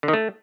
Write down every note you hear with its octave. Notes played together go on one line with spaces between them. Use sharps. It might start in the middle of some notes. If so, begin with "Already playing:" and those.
D3
D#3
A3